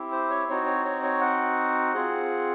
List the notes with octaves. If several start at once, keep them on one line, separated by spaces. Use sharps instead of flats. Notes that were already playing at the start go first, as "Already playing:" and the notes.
Already playing: C4 E4 G4
C5
C#5
C4 D#4 F#4 C#5
C#5
C#5
C#5
F#5
C4 F4 G#4